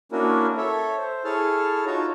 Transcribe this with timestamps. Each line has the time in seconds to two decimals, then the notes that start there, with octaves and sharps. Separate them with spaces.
0.12 A#3 C#4 D4 E4 F#4 A#4
0.57 A4 C#5 E5
0.97 C5
1.24 E4 G#4 A4 C#5 A5 F6
1.86 D#4 F4 F#4 C#5 A5 A#5